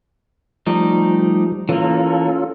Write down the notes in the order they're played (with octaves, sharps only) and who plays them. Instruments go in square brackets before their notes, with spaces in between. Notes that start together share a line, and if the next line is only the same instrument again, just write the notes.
[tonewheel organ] F3 [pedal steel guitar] G3 A3 D#4
[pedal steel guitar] E3 A#3 [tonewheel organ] C#4 F4 A4